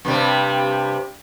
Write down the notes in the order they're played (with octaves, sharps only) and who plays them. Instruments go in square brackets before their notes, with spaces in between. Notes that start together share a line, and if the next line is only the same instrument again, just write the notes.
[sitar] G2 C3 G3